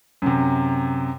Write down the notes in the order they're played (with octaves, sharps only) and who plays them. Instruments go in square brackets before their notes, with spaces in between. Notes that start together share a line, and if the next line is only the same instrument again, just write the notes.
[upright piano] F#2 C3